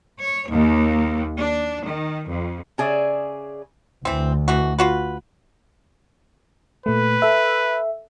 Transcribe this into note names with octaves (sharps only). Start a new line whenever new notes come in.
C#5
D#2
D4
D#3
F2
C#3 G#4 D5 E5
D2 E3 C4
B2 E3 F#4
F4 F#4 B4
A#2 A3 B4
A4 E5